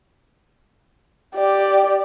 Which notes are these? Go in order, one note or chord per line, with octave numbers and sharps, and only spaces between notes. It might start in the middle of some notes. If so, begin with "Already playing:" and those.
G4 D5